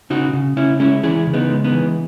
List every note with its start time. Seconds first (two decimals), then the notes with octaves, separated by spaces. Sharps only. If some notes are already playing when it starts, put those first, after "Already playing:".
0.10 C#3 D#4 F#4
0.33 C#3
0.56 C#3 C#4 E4
0.80 G#3 C#4 E4
1.03 E3 E4 G#4
1.27 C#3
1.34 B3 D#4
1.50 G#3
1.64 B3 D#4
1.73 E3